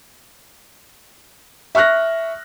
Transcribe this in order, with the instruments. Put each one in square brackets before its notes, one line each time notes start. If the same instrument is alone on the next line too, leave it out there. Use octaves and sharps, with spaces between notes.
[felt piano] E5 C#6 F6 F#6 A#6